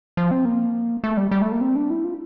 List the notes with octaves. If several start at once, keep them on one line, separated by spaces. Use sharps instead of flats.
F3
C4
A#3
A3
G3
G3
A3
A#3
C4
D4
E4
F4